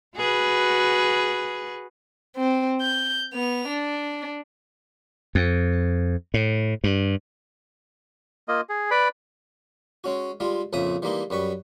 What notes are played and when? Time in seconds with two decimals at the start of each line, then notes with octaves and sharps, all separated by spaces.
0.16 F#4 G#4 B4
2.37 C4
2.82 G6
3.34 B3 F7
3.68 D4
5.35 F2
6.34 A2
6.84 G2
8.48 A#3 F4 D#5
8.69 G#4
8.91 B4 D5 B5
10.04 G#3 C#4 F#4
10.40 G3 G#3 F4
10.73 A#1 F2 C#3 E5 D#6
11.02 E3 G3 G#3 A#3 D#4
11.30 F#2 G3 B4 C#6